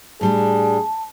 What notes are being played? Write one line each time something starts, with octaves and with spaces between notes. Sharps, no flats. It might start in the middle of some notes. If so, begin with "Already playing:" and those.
A2 G3 D4 G#4 A5